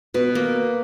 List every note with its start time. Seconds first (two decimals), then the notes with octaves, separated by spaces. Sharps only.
0.14 B2 B4
0.35 A#3